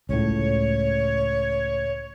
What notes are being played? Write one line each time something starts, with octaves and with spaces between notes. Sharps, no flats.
C#2 A2 C#5